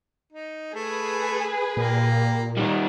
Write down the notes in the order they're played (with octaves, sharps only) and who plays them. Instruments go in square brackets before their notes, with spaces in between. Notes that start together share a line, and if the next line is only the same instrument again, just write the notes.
[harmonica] D#4
[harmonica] A3 [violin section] G#4 B4
[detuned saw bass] A#2 [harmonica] A#3 G4
[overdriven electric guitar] D#3 G3 [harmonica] F#3 D#4